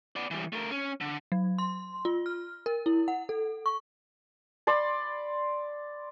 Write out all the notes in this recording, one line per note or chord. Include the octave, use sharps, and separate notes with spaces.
B3 D5
E3 G3
A3 A#4
C#4
D3
F#3
C6
F4
F6
A#4
E4
F#5
A4
C#6
D5 B5 C6